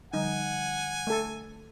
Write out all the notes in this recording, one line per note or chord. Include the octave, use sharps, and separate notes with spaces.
D3 F3 G3 D#4 F#5 G#5
A3 A4